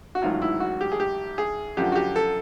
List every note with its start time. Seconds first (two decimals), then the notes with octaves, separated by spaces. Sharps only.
0.15 F#4
0.22 A1 G#2 D#3 F#3 F4
0.42 E4
0.60 F#4
0.81 G4
0.92 G#4
1.00 G4
1.38 G#4
1.77 F#2 D3 F3 G4
1.92 F#4
1.96 G4
2.16 A4